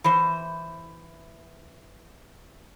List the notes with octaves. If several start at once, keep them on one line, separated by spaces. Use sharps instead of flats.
E3 C5